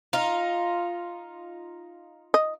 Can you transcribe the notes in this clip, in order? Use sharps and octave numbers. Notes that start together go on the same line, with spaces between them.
D#4 F4
D#5